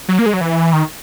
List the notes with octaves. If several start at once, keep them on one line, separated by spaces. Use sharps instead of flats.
F#3
A#3
G#3
F#3
E3
D#3